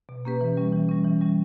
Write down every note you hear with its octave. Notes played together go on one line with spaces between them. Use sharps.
B2
A#3 C#4 G4 B4
E3
G3 C#4
E3
G3 C#4
E3
G3 C#4